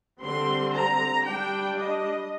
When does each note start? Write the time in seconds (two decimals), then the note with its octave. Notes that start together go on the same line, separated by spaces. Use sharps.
0.21 D3 G3 C4 C6
0.72 A#5
1.24 G3 D4 G5
1.76 D#5